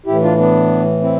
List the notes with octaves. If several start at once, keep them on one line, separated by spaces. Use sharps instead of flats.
A2 E3 E4 G4
D4 F4
B3 D4
C4 E4